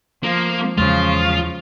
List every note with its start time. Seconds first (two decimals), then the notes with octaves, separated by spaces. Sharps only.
0.23 F3 A#3
0.77 E2 C#3 F3 G#3 F4